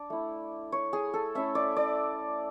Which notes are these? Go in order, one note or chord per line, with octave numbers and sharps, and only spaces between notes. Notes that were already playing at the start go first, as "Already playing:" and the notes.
Already playing: D4 D5
A3 E4
C#5
G#4
A4
A3 C#4 E4 E5
D5
D5